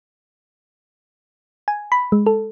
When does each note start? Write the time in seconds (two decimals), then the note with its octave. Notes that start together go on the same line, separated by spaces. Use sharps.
1.68 G#5
1.92 B5
2.12 G#3
2.26 A4